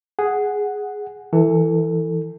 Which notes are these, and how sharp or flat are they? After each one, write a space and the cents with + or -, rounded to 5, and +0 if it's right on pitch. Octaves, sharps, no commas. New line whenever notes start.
G#4 +0 F#5 +0
E3 -5 A4 +25